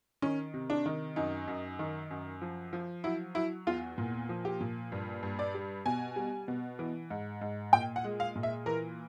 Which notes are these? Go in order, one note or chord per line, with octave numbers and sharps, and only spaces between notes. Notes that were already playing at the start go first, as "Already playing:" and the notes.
D#3 C#4
C3
D4
D#3
F#2 D#4
F#2
D#3
F#2
F3
F3
F#3 E4
F#3 E4
E2 F4
A#2
F3
G4
A#2
G2
G2
D5
G3
B2 G#5
G3
B2
E3
G#2
G#2
A#2 G5
F#5
G#3
F5
A#2
E5
E3 A#4